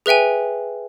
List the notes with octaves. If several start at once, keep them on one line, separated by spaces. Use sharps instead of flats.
G#4 B4 E5 G5 G#5